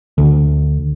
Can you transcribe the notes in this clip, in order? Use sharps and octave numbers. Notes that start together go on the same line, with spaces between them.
D2